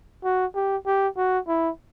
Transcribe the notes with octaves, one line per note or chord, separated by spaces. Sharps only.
F#4
G4
G4
F#4
E4